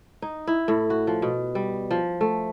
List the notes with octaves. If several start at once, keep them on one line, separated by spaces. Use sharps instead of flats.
D#4
E4
A2
F#4
F3
B2
G3
F3
A3